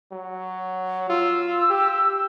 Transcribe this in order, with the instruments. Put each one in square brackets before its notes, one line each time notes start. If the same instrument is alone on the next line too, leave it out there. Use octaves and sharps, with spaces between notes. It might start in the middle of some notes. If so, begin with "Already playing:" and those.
[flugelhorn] F#3
[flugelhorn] F4 [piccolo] E6
[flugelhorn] G4